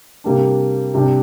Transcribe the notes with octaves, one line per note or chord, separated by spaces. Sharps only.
C3 G3 A#3 D4
C3 G3 D4